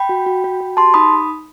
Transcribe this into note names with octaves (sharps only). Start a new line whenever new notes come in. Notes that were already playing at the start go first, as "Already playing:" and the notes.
Already playing: G5 B5
F#4
F#4
F#4
F#4
G4 A5 C6
D#4 B5 D#6